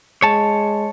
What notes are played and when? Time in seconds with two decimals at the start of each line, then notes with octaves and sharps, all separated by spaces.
0.22 G#3 C#5 A5